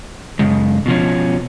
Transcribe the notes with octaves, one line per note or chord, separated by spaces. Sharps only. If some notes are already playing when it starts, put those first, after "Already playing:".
F#2 C#3 G#3
B2 F3 C#4